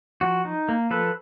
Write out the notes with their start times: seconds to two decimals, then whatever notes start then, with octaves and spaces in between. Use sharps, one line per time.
0.21 F3 F#4
0.45 D#4
0.69 A#3
0.90 F3 A4 B4